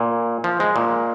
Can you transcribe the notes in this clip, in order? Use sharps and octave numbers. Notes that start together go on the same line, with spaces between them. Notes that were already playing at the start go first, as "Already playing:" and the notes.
Already playing: A#2
F3
G#3
A#2